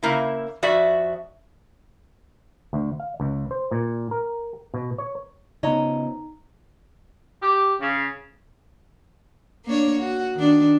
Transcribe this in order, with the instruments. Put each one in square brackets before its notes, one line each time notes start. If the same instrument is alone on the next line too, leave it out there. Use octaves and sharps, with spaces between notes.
[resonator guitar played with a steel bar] C#3 A#3 E4
F2 F#4 D5 E5
[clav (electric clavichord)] D2
F5
C#2
C5
A#2
A#4
B2
C#5
[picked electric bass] C#3 B3 [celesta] D#4 A#5 [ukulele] C#5 D#5
[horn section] G4
C#3
[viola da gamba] A#3 D4 C#5
F#4
D#3 D4